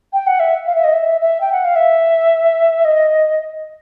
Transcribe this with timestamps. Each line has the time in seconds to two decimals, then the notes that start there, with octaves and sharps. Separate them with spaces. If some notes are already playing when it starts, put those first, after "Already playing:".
0.13 G5
0.27 F#5
0.40 E5
0.66 F5
0.75 E5
0.84 D#5
0.93 E5
1.21 E5
1.41 G5
1.52 F#5
1.65 F5
1.76 E5
2.85 D#5